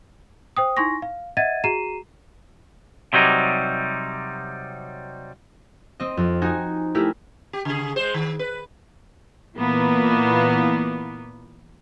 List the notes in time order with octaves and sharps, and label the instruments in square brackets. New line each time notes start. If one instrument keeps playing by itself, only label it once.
[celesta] C5 G5 D#6
D#4 E4 G#5 C6 C#6 A#6
F5
D#5 E5 F#5 G#6 A6 D#7
F#4 G#4 A#5 C7 D#7 E7
[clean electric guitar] C3 F#3 G3 D#4
[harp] C4 D#5
F2
D#4 F#4 G#5 A#5
A3 E4 G4 G#4 A#4
[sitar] G4
C#3 G#4
G#3 C5
D#3
B4
[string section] A#2 E3 A#3 B3